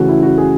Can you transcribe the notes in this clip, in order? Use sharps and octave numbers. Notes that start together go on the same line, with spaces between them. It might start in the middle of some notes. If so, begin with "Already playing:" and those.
Already playing: C#3 E3 A3 F#4
E4
F#4
G#4